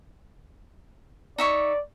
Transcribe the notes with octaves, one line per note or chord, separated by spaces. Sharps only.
D#4 D5 E5 C#6